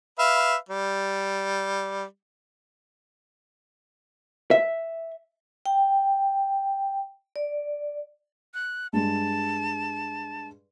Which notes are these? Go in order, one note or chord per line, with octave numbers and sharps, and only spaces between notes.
B4 E5 F5
G3
E5
G5
D5
F#6
G2 G#3 A5